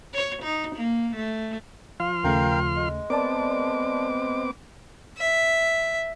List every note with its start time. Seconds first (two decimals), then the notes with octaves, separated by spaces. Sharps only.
0.14 C#5
0.43 D#4
0.76 A#3
1.16 A3
2.00 F3 F5 C6 F6
2.24 D#2 C#3 A3 A#4 F5 G5
2.76 G#3
3.10 B3 C4 A#4 D5 A5 D6
5.18 E5